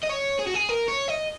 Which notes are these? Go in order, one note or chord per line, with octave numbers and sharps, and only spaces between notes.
D#5
C#5
G#4
F#4
G#4
A#4
C#5
D#5